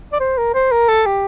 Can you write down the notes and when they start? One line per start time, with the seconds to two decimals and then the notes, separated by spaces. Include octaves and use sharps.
0.13 D5
0.20 C5
0.38 A#4
0.55 C5
0.72 A#4
0.89 A4
1.06 G4